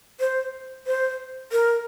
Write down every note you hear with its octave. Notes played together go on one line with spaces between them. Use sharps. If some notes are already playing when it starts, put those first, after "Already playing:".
C5
C5
A#4